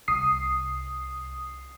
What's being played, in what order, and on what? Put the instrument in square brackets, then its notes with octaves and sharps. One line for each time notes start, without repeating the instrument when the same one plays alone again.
[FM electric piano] C2 D#6 C7